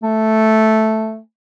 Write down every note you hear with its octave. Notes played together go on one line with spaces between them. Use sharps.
A3